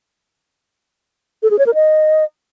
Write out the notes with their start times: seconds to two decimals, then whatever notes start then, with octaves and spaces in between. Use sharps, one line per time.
1.43 A4
1.51 G#4
1.59 C#5
1.66 A#4
1.74 D#5